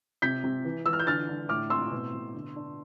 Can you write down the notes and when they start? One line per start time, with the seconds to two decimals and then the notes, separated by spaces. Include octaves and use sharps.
0.22 C3 G6 B6
0.44 C3
0.65 E3
0.86 E3 E6
0.93 F6
0.99 G6
1.07 D3 F6 A6
1.29 D3
1.49 A2 D6 F6
1.70 C4 C6 E6
1.91 B2
2.14 B2
2.34 D3
2.56 D4